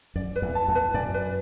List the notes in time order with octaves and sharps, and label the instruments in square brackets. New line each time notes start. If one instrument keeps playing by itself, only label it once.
[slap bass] F#2 [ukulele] D5
[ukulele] B4
[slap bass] E2
[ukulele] A5
[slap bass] E2
[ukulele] B4
[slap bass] F#2 [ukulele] D5
[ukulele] B4